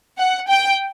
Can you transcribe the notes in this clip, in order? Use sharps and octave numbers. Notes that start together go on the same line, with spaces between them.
F#5
G5